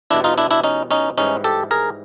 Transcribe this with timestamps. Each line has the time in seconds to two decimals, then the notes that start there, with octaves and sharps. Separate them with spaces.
0.10 E2 B2 G3 D4 E4
0.24 D#4 F4
0.38 D4 E4
0.51 D4 E4
0.64 C#4 D#4
0.91 C#4 D#4
1.17 G#2 E3 G3 C#4 D#4
1.44 G4 A4
1.71 G#4 A#4